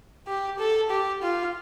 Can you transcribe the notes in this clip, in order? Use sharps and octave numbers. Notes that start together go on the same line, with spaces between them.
G4
A4
G4
F4